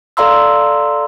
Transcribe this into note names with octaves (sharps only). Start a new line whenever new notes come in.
A4 D5 F5 A#5 C6 E6